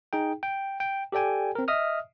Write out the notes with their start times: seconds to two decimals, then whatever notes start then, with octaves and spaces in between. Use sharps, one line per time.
0.13 D#4 G#4 G5
0.43 G5
0.80 G5
1.12 G4 A4 D5 G5 G#5
1.55 C4 A#4
1.68 D#5 E5 D#6 F6